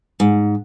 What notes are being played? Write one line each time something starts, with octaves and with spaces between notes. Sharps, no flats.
G#2